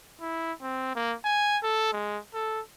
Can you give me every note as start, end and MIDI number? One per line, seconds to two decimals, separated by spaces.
0.21 0.53 64
0.62 0.93 60
0.95 1.15 58
1.25 1.58 80
1.63 1.92 69
1.93 2.18 56
2.34 2.61 69